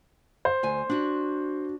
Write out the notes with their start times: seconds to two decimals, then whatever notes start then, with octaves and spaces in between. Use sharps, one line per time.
0.45 C5
0.63 D2 G#5
0.89 D4 F#4